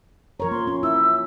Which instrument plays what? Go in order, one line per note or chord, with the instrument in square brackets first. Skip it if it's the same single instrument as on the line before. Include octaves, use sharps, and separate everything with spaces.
[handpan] F3 A#4 C#5 [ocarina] A#5
[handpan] A#3 [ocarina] C6
[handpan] C#4
[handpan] E4 [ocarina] E6